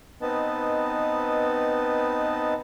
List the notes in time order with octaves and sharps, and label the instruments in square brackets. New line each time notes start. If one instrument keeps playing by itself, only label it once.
[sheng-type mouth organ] B3 C4 D#4 B4 D#5 A5